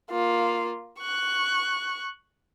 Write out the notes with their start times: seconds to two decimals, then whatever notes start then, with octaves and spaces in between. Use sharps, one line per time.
0.11 A#3 F4
0.99 C#6 F#6